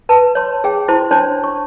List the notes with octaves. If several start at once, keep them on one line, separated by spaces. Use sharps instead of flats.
B4 A5
C#5 C6
G#4 G5
E4 F#4 C5 A5 C6
D4 C5 C#5 A5 C6
C#6